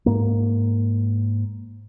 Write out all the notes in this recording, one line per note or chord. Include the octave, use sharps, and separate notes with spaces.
G#2 A#3